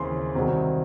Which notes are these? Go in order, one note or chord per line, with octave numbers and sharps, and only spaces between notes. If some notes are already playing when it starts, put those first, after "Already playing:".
Already playing: D#2 C#3 E3 C4 C6
C2 C3 D#3 F#3 C4